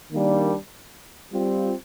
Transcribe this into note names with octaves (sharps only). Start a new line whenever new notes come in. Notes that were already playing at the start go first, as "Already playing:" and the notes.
D#3 G3 A#3 D4
G3 C4 F4